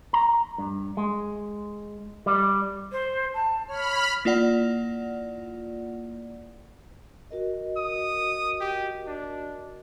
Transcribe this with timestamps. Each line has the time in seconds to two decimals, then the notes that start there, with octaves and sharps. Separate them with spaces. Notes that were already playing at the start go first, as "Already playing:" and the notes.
0.13 A#5
0.58 G2
0.97 G#3
2.26 G3
2.92 C5
3.34 A5
3.68 C#5 B5 F6
4.25 A#3 E4 F4 D5 F#5
7.31 F#4 A#4 D#5
7.77 D#6
8.61 G4
9.07 D4